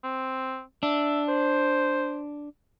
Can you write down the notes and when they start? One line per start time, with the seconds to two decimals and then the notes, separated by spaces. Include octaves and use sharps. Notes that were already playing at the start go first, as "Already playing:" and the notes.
0.04 C4
0.83 D4 E5
1.28 C5